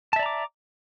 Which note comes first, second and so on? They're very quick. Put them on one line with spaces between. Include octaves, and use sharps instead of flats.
A5 E5 D5 A#5 D6